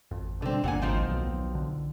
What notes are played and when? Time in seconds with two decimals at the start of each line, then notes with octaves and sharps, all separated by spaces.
0.11 G#1 F2
0.42 B2 D3 G3 C4
0.64 G1 D#2 A#2 A#3 F#5 G#5
0.82 G#1 D#3 F3 C4
1.02 B1
1.55 D3